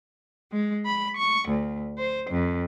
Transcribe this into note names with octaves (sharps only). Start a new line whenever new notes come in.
G#3
B5
C#6
D2
C5
F2